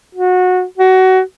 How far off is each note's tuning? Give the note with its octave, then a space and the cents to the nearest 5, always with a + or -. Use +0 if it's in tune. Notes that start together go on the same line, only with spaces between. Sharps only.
F#4 -20
F#4 +20